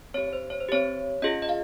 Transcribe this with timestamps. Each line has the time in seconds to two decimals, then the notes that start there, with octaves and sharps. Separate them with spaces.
0.14 C4 G4 C#5
0.27 C#5
0.33 C5
0.50 C#5
0.60 C5
0.69 C4 G4 C#5
1.22 C#4 F4 G#4 D#5
1.42 D#5
1.49 F5